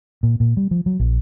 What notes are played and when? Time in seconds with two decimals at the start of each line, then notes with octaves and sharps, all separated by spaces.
0.23 A#2
0.40 A#2
0.57 G3
0.71 F3
0.86 F#3
1.00 A#1